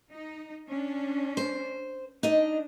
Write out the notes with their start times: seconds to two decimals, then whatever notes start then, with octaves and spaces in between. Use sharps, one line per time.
0.10 D#4
0.69 C#4 D4
1.37 C5
2.23 D4 D#4 D#5